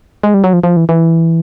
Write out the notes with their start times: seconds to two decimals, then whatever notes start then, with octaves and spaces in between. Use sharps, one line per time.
0.23 G#3
0.34 G3
0.44 F#3
0.53 F3
0.64 F3
0.77 E3
0.89 E3